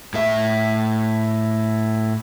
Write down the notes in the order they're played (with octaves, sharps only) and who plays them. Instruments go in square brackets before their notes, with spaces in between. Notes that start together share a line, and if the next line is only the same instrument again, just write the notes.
[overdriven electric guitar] A2 E5